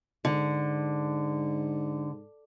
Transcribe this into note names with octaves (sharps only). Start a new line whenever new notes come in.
G#2 D3